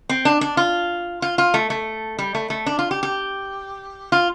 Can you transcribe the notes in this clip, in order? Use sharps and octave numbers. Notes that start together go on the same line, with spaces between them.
C4
D4
D4
F4
F4
F4
A3
A3
G3
A3
A3
D4
F4
G4
G4
F4